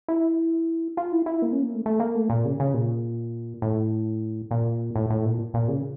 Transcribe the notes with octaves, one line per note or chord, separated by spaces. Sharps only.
E4
F4
E4
E4
A#3
C#4
A#3
A3
A3
A#3
A3
A#2
C#3
C#3
A#2
A2
A#2
A2
A2
A#2
A#2
C#3